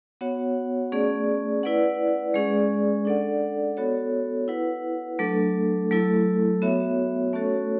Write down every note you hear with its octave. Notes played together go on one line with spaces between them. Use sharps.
B3 F#4 C#5 F#5
A3 C#4 G#4 D5
E4 B4 D5 F#5
G#3 C#4 G#4 D5
D4 A4 D5 F#5
B3 F#4 A4 C#5
E4 B4 F#5
F#3 A3 D4 A4
F#3 A3 E4 A4
B3 F#4 C#5 E5
A3 C#4 F#4 A4 C#5